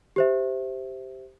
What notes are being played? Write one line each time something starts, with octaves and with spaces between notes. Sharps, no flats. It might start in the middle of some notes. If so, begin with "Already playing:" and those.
G4 C5 E5